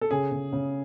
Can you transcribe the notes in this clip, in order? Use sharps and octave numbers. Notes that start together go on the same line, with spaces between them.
A4
C#3 G#4
C#3
C#3